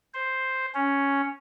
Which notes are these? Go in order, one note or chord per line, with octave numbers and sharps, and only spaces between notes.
C5
C#4